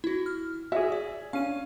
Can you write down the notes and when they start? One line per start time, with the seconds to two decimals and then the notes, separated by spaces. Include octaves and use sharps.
0.04 E4 F#4
0.26 F6
0.72 F#4 G#4 E5
0.92 D5
1.33 C#4 F5 D#7